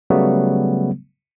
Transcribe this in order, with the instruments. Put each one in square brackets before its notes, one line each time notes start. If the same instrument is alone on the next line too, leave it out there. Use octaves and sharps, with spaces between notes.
[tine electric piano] C#3 F#3 G3 A3 B3